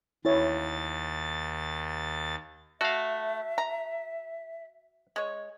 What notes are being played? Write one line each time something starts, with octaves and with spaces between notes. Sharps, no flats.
D#2 E4 C#5 A6
A3 F#4 E5 F5
A#5
G#3 C#5